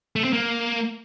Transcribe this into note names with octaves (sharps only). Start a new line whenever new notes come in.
A3
C4
A#3